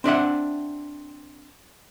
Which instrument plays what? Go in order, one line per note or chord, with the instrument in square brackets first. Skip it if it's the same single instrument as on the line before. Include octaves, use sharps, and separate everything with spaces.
[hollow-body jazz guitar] C4 D4 E5 F#5